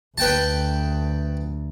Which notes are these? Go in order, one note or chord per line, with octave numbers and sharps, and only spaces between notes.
D2 B4 G5 A5